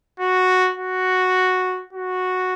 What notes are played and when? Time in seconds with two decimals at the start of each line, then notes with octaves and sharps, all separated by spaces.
0.20 F#4
0.78 F#4
1.93 F#4